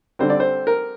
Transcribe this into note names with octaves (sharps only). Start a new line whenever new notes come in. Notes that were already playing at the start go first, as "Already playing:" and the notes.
D3 G3 C4 C5
D5
C5
A#4